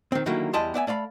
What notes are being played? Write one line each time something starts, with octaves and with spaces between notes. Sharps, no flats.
D#3 C4
D3 D#3 F#3 G3 A#3 E4
E2 G3 E4 D#5 A5 C6
B3 D5 E5 G#5
A3 D5 F5 B5